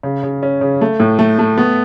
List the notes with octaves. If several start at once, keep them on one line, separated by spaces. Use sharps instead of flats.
C#3
C#3
C#4
C#3
A3
A2
A3
A3
B3